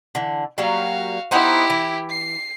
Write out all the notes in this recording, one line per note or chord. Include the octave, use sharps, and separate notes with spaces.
D3 E3
F#3 G3 A#3 F#4 F5
B3 D#4 E4 G4 C5
E3
C7